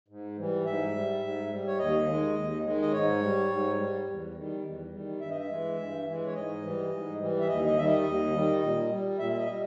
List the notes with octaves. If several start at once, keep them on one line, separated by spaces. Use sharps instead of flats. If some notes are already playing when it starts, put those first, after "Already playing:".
G#2
E3 G3
G#2 E5
G3
G#2
G3
C#5
D#2 D#5
D#3 G#3
D#2
D#3 G#3
D#5
G#2 C#5
G3
G#2
G3
E2
D#3 G3
E2
D#3 G3
G2 E5
D#5
E5
E3 G#3
G2
E3 G#3
C#5
G#2 D#5
E3 G3
G#2
E3 G3
E5
D#2 D#5
D#5
D#3 G3 E5
D#5
D#2
D#3 G3
A#2
G3
A#2 E5
E5
D#5
G3